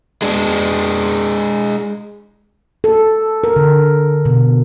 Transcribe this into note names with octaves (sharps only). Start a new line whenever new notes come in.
G#3 D4
A4
A#4
D3
B2